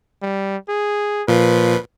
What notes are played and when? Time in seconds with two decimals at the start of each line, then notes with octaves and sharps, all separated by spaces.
0.22 G3
0.69 G#4
1.28 A#2 F3 B4